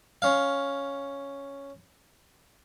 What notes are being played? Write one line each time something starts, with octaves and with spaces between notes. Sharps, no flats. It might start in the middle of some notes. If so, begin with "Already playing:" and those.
C#4 F5